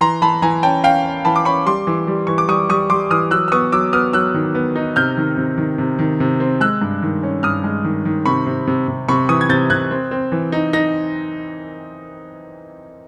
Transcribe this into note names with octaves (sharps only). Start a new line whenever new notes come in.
E3 A#5 C6
E3 A5 B5
E3 G#5 A#5
C#4 G5 A5
C#4 F5 G5
C#4
E3 A5 B5
D6
C#4 B5 C#6
G3 C6 D6
E3
G3
E3 C#6
D6
G3 C#6 D#6
G3 C#6 D#6
G3 C6 D6
E3 D#6 F6
F#3 E6 F#6
E6
B3 C#6 D#6
F#3 D6 E6
B3 D#6 F6
F#3 E6 F#6
D#3
B3
D#4
C3 F6 G6
D#3
C3
D#3
C3
D#3
C3
C4
G#3 E6 F#6
G2
D#3
C#4
G2 D#6 F6
G#3
D#3
D#3
C3 B5 C#6
C3
C3
C3
C3 B5 C#6
E3 C#6 D#6
G#6
C3 G6 A6
C3 F#6 G#6
C4
C4
E3
D#4
D#4 A#6